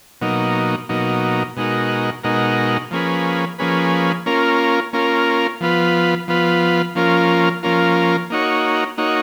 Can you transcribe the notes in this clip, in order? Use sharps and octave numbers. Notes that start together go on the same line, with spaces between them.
B2 F#3 A#3 D#4
B2 F#3 A#3 D#4
B2 G#3 D#4 F#4 A#4
B2 G#3 D#4 F#4 A#4
F3 A#3 C#4 G#4 B4
F3 A#3 C#4 G#4 B4
A#3 C#4 F4 A#4
A#3 C#4 F4 A#4
F3 B3 F4 B4
F3 B3 F4 B4
F3 A#3 C#4 F4 A#4
F3 A#3 C#4 F4 A#4
A#3 D#4 F#4 C#5
A#3 D#4 F#4 C#5